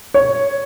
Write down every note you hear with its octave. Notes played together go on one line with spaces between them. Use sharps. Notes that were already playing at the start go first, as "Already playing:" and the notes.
C#5